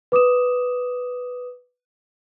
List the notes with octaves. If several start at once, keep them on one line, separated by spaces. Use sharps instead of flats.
B4 D6 D#6 E7